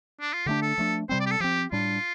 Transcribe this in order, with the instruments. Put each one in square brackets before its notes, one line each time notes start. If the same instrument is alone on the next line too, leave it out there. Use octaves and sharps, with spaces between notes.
[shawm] D4
F4
[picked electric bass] D3 A3 D4 [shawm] G4
[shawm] A4
[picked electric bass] F3 A3 D4
[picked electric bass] C3 G3 C4 [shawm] C5
[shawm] D5
G4
A4
[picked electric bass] F3 C4 [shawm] G4
[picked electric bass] A2 G3 D4 [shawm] F4